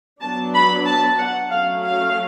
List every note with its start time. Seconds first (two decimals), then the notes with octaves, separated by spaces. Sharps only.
0.22 F#3 B3 D4 A5
0.54 B5
0.86 A5
1.18 F#5
1.50 F#3 A3 C#4 F5
1.83 F5